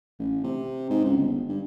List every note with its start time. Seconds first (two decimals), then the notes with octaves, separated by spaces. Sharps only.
0.19 A1
0.43 C3
0.90 G#2
1.04 C#2
1.17 G1
1.49 G2